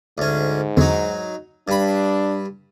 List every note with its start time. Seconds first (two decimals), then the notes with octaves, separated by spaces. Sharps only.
0.18 D2 G#2 C#4
0.77 E2 D3 F#3 D#4
1.68 G2 D4 B5